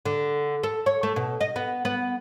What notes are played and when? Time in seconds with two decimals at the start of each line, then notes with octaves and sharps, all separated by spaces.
0.06 D3
0.63 A4
0.86 C#5
1.03 A3
1.16 B2
1.41 D#5
1.56 B3
1.85 B3